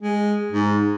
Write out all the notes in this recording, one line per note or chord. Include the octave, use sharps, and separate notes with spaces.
G#3
G#2